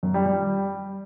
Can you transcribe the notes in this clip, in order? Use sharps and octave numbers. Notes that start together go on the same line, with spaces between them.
F#2
G3
G3